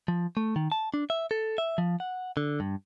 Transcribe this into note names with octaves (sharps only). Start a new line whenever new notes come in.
F3
A3
D#3
A5
D4
E5
A4
E5
F3
F#5
D3
G2